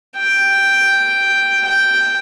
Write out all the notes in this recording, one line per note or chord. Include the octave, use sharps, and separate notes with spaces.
G5
G5